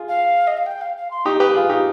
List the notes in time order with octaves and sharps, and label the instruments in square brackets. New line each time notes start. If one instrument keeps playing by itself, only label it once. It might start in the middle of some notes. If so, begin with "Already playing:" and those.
Already playing: [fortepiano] F4 G#4
[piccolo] F5
D#5
F5
G5
F5
F5
C6
[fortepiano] D#4 G4 [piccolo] D#6
[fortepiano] G4 B4
B4
F4 G#4
D#4 G4